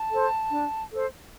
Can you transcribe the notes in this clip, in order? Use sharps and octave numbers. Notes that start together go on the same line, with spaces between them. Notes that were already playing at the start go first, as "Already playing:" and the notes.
Already playing: A5
A4 C5
D4
A4 C5